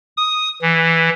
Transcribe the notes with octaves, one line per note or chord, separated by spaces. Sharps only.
D#6
E3